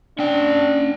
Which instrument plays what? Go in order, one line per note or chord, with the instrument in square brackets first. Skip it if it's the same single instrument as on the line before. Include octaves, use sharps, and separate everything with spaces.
[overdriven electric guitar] C#4 G5 [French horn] D4